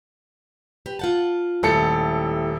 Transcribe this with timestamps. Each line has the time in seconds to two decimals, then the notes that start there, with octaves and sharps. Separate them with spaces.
0.86 G4 B4
0.99 F4 F#5 A5
1.63 D#1 A2 G#3 G4 A4 C#7